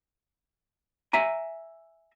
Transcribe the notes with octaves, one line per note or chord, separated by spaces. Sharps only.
E5 G#5 A#5